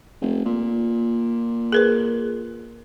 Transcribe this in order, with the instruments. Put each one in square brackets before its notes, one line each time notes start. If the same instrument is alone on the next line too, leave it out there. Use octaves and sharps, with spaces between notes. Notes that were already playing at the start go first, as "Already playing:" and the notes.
[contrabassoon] F1
A#2
[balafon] G#4 A#4 B4